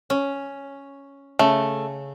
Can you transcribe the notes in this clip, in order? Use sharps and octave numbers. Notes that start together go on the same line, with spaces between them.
C#4
C#3 A3